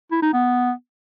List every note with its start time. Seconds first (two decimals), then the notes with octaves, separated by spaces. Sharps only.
0.11 E4
0.22 D#4
0.33 B3